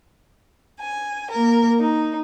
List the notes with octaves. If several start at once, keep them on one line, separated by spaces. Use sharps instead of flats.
G#5
A#3 A#4
D#4